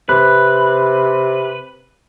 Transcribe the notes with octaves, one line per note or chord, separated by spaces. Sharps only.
C3 B4